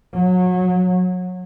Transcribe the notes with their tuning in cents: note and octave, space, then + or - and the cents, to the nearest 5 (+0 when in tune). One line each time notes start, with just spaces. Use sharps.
F#3 -25